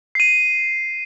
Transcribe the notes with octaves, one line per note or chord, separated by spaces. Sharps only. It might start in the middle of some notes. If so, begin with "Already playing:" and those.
C7 D#7